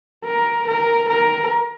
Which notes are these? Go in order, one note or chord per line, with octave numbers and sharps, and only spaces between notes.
A#4
A#4
A#4